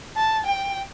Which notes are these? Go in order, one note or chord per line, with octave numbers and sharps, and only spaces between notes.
A5
G5